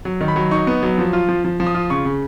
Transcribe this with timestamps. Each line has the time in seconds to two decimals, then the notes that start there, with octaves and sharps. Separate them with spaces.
0.05 F#3
0.21 D#3
0.28 B5
0.36 F#3
0.51 D#4 C#6
0.67 B3
0.83 F#3
0.98 F3
1.13 F4
1.29 F3
1.45 F3
1.60 F3
1.67 D#6
1.75 F4
1.90 C#3 C#6
2.05 C#3